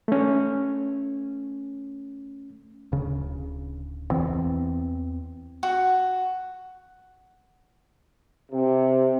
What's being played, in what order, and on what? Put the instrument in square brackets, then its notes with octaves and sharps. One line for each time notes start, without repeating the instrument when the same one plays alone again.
[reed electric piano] A3 C#4
[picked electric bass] D1 C#3
E2 E3 C4
[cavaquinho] F#4
[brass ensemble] C3